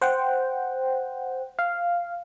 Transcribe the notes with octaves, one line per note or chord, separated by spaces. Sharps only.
C5 F#5 G5
F5